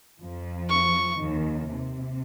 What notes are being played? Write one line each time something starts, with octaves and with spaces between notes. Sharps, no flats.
F2 F3
C#6
D#2 D#3
C3